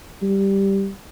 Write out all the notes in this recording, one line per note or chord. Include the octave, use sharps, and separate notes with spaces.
G3